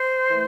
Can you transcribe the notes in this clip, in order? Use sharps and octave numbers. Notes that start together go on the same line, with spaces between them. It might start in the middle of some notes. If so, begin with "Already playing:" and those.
Already playing: C5
E3 A3